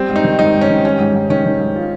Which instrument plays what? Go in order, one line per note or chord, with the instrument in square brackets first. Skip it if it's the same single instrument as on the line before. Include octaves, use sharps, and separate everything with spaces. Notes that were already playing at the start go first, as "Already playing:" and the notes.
Already playing: [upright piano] G3 [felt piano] C4
[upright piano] G#2
[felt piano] D#4
[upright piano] D#3
[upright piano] G#2 [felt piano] D#4
[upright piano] G#2
[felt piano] C#4
[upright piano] D#3
[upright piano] G3 [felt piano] C#4
[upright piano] G#2
G#2
[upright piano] D#3 [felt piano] C#4
[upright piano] D#3
G#2
F4